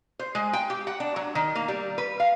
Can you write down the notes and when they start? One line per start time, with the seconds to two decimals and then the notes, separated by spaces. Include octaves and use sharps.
0.19 C5
0.35 G#3
0.53 G5
0.70 G4
0.87 F#5
1.00 D4
1.16 F#3
1.35 D#3
1.55 A#3
1.68 G3
1.98 B4
2.20 F5